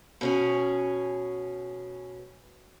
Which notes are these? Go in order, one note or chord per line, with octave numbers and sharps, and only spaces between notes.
B2 C#4 G#4